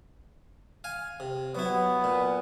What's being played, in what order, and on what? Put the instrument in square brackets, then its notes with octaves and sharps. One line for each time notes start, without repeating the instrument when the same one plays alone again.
[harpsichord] F5 G#5
C3
[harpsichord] F#3 E4 [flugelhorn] B3
[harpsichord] A#2